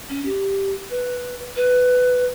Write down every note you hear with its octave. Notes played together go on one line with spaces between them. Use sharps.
C#4
G4
B4
B4